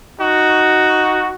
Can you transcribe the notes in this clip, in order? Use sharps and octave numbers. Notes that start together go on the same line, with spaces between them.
D#4 F#4